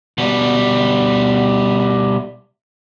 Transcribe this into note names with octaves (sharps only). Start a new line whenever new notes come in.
B2 G3